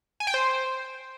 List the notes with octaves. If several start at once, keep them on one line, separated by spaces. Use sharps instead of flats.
G#5
G5
C5